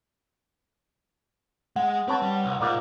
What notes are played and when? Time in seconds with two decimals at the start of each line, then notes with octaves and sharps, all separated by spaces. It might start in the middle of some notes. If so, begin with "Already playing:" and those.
1.76 G#3 F#5
2.08 C4 B4 C#5 A5
2.22 G3
2.43 C2
2.60 G#2 B2 A#3 F4 D5